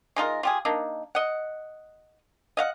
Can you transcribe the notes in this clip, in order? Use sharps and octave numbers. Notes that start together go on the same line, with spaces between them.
G#3 D#4 F4 A#4
F4 G4 G#4
A#3 D4 D#4
D#5 F#5
D#5 F5 F#5